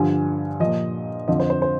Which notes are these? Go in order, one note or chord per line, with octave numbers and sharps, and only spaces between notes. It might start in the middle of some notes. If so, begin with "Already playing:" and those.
Already playing: G2 D3 F3 G#5
A#2 F3 D#5
F2 D3 F3 D#5
C5
C5
C5